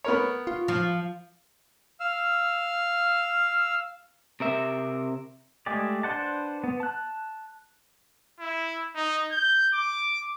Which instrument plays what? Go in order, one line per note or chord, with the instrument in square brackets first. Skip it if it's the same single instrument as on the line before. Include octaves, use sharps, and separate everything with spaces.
[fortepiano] B3 A#4 C#5
[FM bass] F4
[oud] F3
[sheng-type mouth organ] F5 E6 F6
[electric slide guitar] C3 A#4 E5
[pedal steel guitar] G#3 A3 G4 G#4 D5
D4 B4 C5 F#5 A5
B3
A5 F#6
[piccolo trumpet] E4
D#4
G6
D6